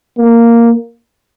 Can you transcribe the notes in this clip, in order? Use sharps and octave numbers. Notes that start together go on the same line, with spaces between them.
A#3